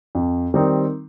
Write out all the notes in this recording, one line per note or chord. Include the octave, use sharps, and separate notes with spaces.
F2
D#3 G3 C4 D#4